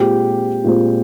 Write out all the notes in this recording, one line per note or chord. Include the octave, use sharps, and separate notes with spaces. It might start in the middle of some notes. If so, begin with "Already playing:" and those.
Already playing: A#2 G#3 C4 G4
A#2 G#3 C4